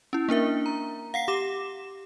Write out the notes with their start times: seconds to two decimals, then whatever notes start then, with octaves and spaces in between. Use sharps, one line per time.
0.13 C#4 E4
0.29 A#3 D4 A#4 E5
0.66 A#5
1.14 F5 F#5 C7
1.28 G4 D6 E7